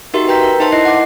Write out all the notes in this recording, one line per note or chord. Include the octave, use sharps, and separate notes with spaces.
D#4 F#4 G4 A#4 E5 C6
B4 G5 A#5 G6 B6
A#4
D#4 C5 E5 A5 C6
E4 D#5 C7
F#5 D6